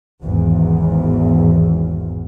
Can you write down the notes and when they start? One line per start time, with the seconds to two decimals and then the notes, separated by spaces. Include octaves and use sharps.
0.23 G#1 E2